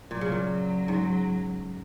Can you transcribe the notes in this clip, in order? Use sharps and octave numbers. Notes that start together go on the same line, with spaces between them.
A#2 F#3
C#3
A#2
G#2